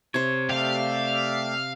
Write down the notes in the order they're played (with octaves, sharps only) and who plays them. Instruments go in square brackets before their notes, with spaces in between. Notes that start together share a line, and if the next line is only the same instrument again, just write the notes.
[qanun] C3 C5 [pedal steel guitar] C#5
[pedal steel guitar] A3 G4 [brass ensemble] D5 E5 [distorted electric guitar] F5